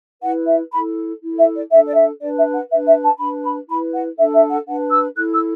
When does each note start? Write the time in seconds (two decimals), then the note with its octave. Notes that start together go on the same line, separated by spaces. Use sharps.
0.22 E4 B4 F#5
0.46 E5
0.72 E4 A4 B5
1.21 E4 A4
1.37 E5
1.54 D5
1.70 D4 A4 E5
1.87 D5
1.94 E5
2.20 D4 B4 D5
2.35 E5
2.52 F#5
2.70 D4 B4 E5
2.85 E5
3.02 A5
3.18 D4 B5
3.21 B4
3.43 B5
3.68 E4 B5
3.72 B4
3.93 F#5
4.17 D4 A4 E5
4.33 E5
4.50 F#5
4.67 D4 B4 F#5
4.91 E6
5.15 E4 A4 F#6
5.32 E6